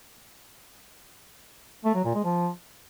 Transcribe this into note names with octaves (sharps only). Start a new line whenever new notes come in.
A3
F#3
A#2
G#3
F3